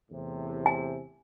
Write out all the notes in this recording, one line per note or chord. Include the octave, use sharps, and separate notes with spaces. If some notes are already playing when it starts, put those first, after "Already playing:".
E2 A2 C3
G#5